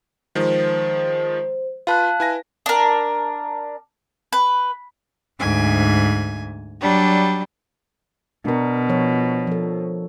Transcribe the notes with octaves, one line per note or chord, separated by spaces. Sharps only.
D#3 F3 G#3 C5
F4 B4 F5 A5 F#6
E4 B4 G#5 A#6
D4 A#4
B4
D2 G#2 G#5
F#3 G3 D4
B2 D4 A#4
F3 C#5
F3 A4